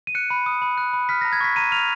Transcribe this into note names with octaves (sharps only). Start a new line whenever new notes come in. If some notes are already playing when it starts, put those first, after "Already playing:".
D#7
F#6 C#7
B5
D#6
B5
F#6
B5
F6 B6
A#5 A#6
G#6
C#6 B6
A#5 D#7
F6 F7